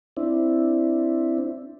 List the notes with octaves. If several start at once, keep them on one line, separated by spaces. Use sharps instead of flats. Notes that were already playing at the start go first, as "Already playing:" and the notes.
C4 D4 E4